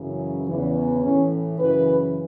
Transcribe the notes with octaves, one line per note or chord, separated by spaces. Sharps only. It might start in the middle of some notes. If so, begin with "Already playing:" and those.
Already playing: F#2 C#3 E3
E2 C#3 E3
A2 E3 C#4
F#2 C#3 E3 B4